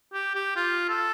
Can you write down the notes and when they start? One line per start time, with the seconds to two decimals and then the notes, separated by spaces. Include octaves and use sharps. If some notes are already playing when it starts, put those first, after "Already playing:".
0.13 G4
0.35 G4
0.56 F4
0.89 A4